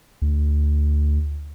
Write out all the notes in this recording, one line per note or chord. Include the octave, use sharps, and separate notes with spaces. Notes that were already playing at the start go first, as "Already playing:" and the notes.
D2